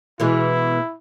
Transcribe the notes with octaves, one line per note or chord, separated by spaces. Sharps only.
B2 E3 G#3 E4